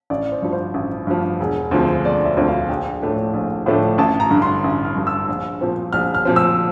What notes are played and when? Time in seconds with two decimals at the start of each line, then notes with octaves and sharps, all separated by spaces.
0.10 A1 D5
0.32 C5
0.42 G2 F3
0.53 C5
0.74 A1
1.07 G2 F3
1.40 E1
1.71 D2 D3 F3 C4
2.04 E1 D5
2.25 E5
2.37 D2 D3 F3 C4
2.48 F5
2.69 A#1 G5
3.02 A2 F3 A3 D4
3.34 A#1
3.66 A2 F3 A3 D4
3.98 A1 A5
4.20 A#5
4.30 G2 D3
4.42 C6
4.64 A1
4.85 F6
4.96 G2 D3
5.07 E6
5.28 A#1
5.61 A#2 F3 C4
5.93 A#1 F6
6.15 F6
6.25 A#2 F3 C4
6.36 E6